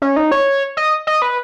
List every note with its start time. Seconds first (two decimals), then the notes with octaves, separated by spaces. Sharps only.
0.02 C#4
0.16 D#4
0.32 C#5
0.77 D#5
1.07 D#5
1.22 B4